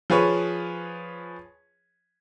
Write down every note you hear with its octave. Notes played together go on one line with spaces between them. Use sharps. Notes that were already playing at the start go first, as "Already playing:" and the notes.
F3 G#4 B4 C#5